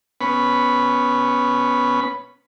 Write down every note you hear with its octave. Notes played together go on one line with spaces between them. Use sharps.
B3 C#4 B5